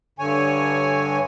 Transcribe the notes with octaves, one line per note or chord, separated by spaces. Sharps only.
G2 D3 C#5 G#5